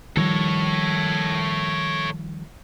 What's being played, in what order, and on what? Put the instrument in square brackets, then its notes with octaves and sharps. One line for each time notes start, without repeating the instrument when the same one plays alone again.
[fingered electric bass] D#3 F3 G3 [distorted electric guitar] A4 C#5